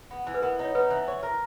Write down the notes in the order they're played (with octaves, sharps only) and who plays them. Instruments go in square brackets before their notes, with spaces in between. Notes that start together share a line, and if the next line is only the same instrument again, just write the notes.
[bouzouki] B3
E3
[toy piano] B4
[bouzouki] B3 [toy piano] A#4
[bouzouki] D#4 [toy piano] C#5
[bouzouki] B3 [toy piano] B4
[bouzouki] E3
C#5
A#4